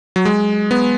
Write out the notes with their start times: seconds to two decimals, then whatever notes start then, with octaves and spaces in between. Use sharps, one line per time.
0.16 F#3
0.25 G#3
0.71 B3